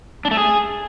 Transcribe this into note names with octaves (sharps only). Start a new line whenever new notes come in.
D4
A3
G#4